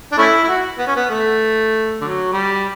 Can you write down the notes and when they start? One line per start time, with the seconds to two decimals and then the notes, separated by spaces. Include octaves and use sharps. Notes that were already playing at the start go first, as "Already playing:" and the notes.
0.12 D4
0.18 A3 C#4 E4
0.44 E4
0.48 F#4
0.78 B3
0.87 C#4
0.96 B3
1.09 A3
2.01 D3 F#3
2.33 G3